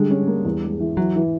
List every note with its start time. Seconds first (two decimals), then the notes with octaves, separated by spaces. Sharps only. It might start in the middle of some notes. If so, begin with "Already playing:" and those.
Already playing: D3 G3 G#3
0.10 C#4
0.27 A#3
0.45 E2
0.63 G#3
0.80 E3
0.97 E3 F#3
1.16 E3